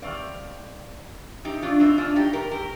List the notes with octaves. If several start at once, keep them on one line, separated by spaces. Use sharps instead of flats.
D#3 G3 C4 D5 F5
D#4 G4
D4 F4
C4 D#4
D4 F4
D#4 G4
G4 A#4
G4 A#4